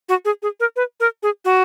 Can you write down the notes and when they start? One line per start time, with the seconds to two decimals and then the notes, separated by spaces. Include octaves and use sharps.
0.09 F#4
0.25 G#4
0.42 G#4
0.60 A#4
0.76 B4
1.00 A#4
1.23 G#4
1.45 F#4